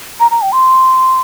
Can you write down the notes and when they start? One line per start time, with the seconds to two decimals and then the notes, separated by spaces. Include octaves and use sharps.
0.20 A#5
0.31 A#5
0.42 G5
0.52 C6